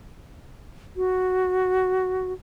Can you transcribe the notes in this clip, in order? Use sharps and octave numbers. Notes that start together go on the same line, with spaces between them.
F#4